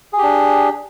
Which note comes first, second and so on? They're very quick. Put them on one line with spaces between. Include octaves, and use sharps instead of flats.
G#4 G4 D4